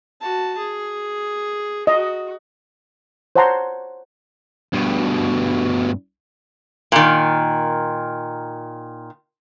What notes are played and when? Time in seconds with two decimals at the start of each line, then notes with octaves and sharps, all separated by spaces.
0.21 F#4 A5
0.58 G#4
1.87 F#4 D#5
3.36 C5 C#5 F#5 A5 A#5 C6
4.73 G2 B2
6.92 A#2 D#3